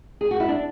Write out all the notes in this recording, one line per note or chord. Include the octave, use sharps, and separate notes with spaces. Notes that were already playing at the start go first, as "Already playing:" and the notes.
G#4
F#4
E4
D4